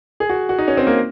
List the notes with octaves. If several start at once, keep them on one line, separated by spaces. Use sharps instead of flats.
G#4
F#4
F#4
D#4
C#4
C4
A#3